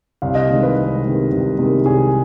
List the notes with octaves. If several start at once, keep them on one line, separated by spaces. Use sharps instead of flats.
C2 F5
D#5
C3 D#3 G#3
B4
C2
C3 D#3 G#3
C2
C3 D#3 G#3
C2 G#4